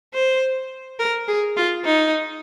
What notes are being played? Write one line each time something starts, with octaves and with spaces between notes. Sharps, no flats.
C5
A#4
G#4
F4
D#4